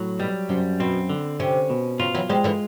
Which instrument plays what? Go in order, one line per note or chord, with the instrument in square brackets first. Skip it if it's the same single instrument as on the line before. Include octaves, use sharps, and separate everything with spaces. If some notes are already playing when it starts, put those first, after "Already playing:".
Already playing: [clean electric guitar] A2 F#3
[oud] B2 [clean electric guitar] G3
[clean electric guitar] F#2 [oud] C3
[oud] B2 [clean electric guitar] C4
[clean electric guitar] D3
[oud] C3 [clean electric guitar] C#4
[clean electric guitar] B2
[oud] C#3 [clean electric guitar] F4
[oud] E3 F#3
[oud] F3 G3 [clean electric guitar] G#3
[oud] D3 E3